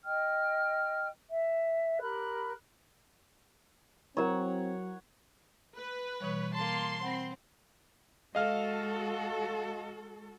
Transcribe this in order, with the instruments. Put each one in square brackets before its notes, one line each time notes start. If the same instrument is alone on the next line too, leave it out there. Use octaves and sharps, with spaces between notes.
[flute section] D#5 G5 F6
E5
G4 A#4 B5 F#6
[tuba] F#3 [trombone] C4 [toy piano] E4 A#4 A#5 [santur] C#5 F#5
[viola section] B4
[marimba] B2 E3 G3 [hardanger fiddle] C#5
[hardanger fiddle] A#3 A5 [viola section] C6
[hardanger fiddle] C4 [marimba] F#5 B5 A#6
[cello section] G#3 F#4 A4 [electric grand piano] D#5 F5 F6